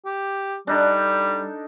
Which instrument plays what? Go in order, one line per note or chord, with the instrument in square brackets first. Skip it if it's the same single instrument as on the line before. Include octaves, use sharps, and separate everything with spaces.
[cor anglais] G4
[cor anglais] G3 [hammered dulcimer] D4 D#4 A4